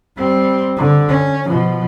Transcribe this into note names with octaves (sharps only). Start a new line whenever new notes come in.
G3 C4
D3
C#4
B2 F3